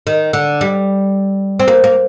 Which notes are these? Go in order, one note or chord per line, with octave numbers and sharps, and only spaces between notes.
D#3
D3
G3
C4
A#3
A#3